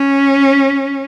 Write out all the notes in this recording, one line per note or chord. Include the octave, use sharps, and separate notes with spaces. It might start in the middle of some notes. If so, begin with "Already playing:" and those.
Already playing: C#4